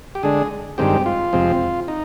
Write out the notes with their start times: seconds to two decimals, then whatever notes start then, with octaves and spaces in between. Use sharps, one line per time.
0.15 G4
0.23 D3 G#3 D4 G#4
0.78 G2 D#3 G#3 C4 G4
1.06 F4
1.33 F2 C3 F3 G#3 C4
1.88 D#4